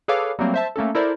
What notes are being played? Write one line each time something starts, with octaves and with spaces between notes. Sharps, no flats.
G#4 A4 B4 C#5 F5 D6
F#3 G3 A3 A#3 C4
C5 E5 A5
A3 A#3 C#4 A4
E4 A4 A#4 C5 D5